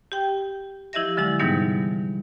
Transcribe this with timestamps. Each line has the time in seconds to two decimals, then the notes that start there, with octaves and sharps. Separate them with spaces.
0.12 G4 G5
0.93 F3 E4 G4 D#5 E5 A#6
1.17 D3 F#3 G#3 E4
1.39 G#2 C3 E3 G3 B3 D#4